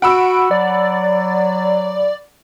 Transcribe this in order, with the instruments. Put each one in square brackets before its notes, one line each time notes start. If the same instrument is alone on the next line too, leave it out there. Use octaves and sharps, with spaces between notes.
[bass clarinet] F#4 [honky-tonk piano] F#5 B5 E6 [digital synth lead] D7
[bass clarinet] F#3 [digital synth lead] D5